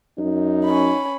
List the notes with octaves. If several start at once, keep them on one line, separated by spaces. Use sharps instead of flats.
F#2 D#4
C#4 B5